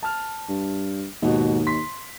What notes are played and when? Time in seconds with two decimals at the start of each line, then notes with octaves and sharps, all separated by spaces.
0.02 A5 F6
0.49 G2
1.22 D#2 G#2 B2
1.67 C6 B6